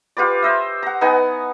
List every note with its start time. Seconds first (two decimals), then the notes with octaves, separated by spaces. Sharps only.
0.17 F4 G4 B4 D5
0.43 C5 D#5 E5
0.83 F#5 A#5
1.01 B3 D#4 F#5 G#5